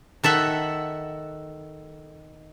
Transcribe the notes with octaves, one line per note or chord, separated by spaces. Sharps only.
D#3 A4 E5 F#5